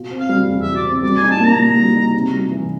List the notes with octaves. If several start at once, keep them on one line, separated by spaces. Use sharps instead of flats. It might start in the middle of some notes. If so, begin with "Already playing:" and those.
Already playing: B2 F4
C4
F5
G3
E2
B2 E5
D5
C4
G3 D5
G#5
D#4
A5
A#3 A#5
A#2
G3
D#4
C3
G3
E3